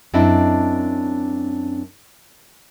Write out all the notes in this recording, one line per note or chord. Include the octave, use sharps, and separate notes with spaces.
F#2 C4 D4 E4 D#5